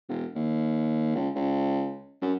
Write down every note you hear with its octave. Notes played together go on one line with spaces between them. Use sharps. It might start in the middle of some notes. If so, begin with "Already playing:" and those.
E1
D#2
C#2
C#2
F#2